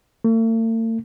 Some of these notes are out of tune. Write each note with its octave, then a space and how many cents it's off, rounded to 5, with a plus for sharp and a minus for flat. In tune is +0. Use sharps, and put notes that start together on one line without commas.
A3 +45